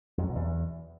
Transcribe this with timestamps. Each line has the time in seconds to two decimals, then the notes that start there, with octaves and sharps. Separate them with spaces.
0.18 F2
0.24 F#3
0.30 B2
0.35 E2